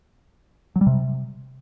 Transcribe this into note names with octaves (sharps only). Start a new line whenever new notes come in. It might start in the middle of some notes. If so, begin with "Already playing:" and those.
F#3
G3
C3